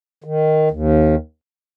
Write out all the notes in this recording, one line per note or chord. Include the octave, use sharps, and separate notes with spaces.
D#3
D#2